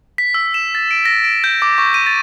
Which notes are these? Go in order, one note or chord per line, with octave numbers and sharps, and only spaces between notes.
B6
E6
E7
A6
D7
A#6
D7
G6
D6
C#6
D#7
A6